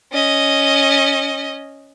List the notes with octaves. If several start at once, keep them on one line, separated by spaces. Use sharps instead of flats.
C#4 D#5